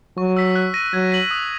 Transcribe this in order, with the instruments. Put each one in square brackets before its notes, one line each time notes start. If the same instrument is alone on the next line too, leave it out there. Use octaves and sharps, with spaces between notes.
[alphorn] F#3 [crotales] C#6
[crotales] E6 B6
F#6
A#6 D#7
[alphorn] F#3 [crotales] G#6
[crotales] B6 F#7
D#6